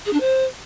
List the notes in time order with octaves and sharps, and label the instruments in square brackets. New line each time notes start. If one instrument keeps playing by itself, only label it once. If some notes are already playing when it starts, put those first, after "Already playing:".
[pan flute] G#4
D4
C5